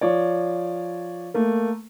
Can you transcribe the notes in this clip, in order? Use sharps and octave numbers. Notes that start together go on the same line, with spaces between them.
F3 C#5 D5
A3 A#3